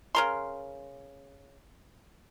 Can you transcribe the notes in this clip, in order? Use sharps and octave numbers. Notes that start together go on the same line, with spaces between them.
C#3 A#4 C6